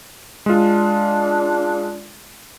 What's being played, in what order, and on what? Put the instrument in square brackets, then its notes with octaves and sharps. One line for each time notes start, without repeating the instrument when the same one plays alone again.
[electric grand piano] G#3 F4 [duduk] D4